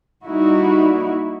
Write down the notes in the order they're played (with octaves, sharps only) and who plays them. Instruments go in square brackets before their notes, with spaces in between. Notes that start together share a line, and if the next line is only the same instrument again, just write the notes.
[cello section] G3 A#3 D#4 E4 F#4